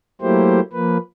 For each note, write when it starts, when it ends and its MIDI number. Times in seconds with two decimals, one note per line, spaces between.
0.22 0.60 54
0.22 0.60 57
0.22 0.60 58
0.22 0.60 64
0.22 0.60 67
0.22 0.60 72
0.73 0.98 53
0.73 0.98 58
0.73 0.98 71